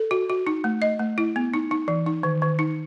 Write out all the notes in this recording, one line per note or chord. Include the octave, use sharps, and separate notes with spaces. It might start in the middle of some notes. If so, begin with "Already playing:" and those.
Already playing: A4
F#4
F#4
D#4
A3
D#5
A3
E4
B3
D#4
D#4
E3
D#4
D#3
D#3
D#4